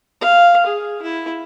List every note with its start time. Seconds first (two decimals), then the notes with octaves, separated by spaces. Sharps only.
0.21 F5
0.66 G#4
1.02 E4